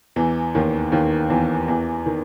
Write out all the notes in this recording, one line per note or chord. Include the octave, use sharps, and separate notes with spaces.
E2 E3
D#2 D#3
D#2 D#3
E2 E3
E2 E3
D#3